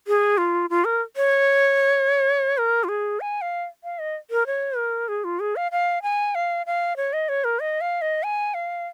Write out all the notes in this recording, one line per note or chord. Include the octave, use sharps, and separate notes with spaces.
G#4
F4
F4
A#4
C#5
A#4
F4
G#4
G#5
F5
F5
D#5
A#4
C#5
A#4
G#4
F4
G#4
F5
F5
G#5
F5
F5
C#5
D#5
C#5
A#4
D#5
F5
D#5
G#5
F5